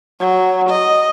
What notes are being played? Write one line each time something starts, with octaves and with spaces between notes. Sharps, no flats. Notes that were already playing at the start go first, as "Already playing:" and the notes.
F#3
D#5